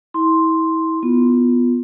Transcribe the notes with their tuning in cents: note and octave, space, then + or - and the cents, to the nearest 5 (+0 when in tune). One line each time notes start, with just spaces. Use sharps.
E4 -35 C6 +0
B3 +0 F4 +0